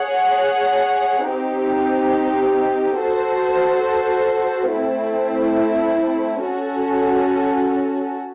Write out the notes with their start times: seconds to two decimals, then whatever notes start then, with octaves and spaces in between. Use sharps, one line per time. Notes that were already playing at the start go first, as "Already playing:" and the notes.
Already playing: G#4 C#5 F#5
1.28 C4 D#4 G4
3.00 F#4 A4 C5
4.71 A3 C4 E4
6.43 C#4 F#4 A4